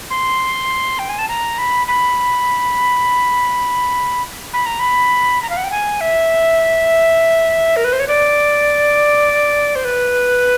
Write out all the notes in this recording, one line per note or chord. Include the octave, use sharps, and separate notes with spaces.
C6
G5
G#5
A5
A#5
B5
B5
B5
A#5
B5
A#5
F5
F#5
G5
G#5
E5
A#4
B4
C5
C#5
D5
C5
B4